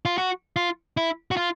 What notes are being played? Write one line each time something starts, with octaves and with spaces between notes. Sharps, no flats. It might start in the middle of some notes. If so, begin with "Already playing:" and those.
F4
F#4
F4
E4
F#4
F4